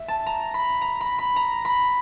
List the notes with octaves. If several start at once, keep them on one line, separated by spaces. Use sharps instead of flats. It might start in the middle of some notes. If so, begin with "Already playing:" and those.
Already playing: E5
A5
A#5
B5
A#5
B5
B5
A#5
B5